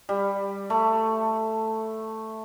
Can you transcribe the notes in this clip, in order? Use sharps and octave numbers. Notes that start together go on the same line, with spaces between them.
G3
A3